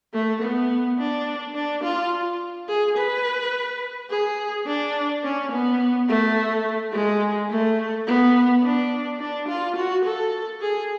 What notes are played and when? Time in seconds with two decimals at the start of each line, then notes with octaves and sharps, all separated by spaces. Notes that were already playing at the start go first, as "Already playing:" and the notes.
0.14 A3
0.42 B3
0.99 D4
1.55 D4
1.84 F4
2.68 G#4
2.97 B4
4.10 G#4
4.66 D4
5.24 C#4
5.52 B3
6.08 A3
6.92 G#3
7.50 A3
8.07 B3
8.63 D4
9.20 D4
9.48 F4
9.76 F#4
10.05 A4
10.61 G#4